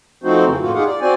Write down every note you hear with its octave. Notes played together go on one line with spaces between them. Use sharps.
F3 A3 C4 D#4 F#4 C5
F2 C#3 E3
F#2 A2 A3 A#3 F4 F#4
D#4 F4 G4 G#4 F5 F#5
D5
C4 F#4 C5 D5 G#5